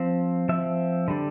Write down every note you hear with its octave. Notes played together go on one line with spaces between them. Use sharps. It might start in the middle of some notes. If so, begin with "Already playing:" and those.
Already playing: F3 C4
F3 C4 E5
D3 G3 D4